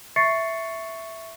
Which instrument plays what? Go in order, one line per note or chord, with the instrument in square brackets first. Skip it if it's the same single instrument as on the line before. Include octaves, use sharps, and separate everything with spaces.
[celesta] E5 C#6 A6 C7 C#7